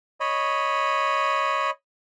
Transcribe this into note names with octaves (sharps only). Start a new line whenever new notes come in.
C#5 D#5 B5